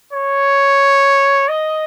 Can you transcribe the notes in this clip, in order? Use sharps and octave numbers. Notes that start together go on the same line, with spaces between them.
C#5
D#5